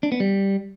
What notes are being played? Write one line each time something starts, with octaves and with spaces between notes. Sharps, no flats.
D4
B3
G3